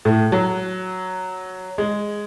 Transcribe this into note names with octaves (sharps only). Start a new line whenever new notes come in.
A2
F#3
G#3